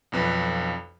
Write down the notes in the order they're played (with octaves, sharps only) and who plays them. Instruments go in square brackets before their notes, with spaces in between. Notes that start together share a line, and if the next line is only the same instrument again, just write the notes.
[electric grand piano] B1 F2 B4